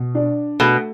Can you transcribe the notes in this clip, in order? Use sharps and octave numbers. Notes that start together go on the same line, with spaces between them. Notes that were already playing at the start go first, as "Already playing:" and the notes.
Already playing: B2
D4
B2 A3